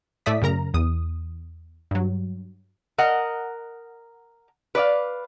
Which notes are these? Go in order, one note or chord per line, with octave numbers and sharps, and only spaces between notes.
A2 A3 D5 E5 D#6 B6
F#2 C#3 A#4 A#5
E2 D#6
G2 F#3
A#4 D#5 F#5
B4 D5 D#5 F5